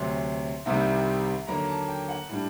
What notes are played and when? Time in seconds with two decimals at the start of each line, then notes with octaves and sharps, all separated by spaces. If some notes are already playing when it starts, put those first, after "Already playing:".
Already playing: D2 C3 F#3 C6
0.65 C2 C3 D#3 G3
1.47 D#2 D3 F#3 A#3 A#5
1.68 A5
1.88 G5
2.09 F#5
2.29 A2 G3 D4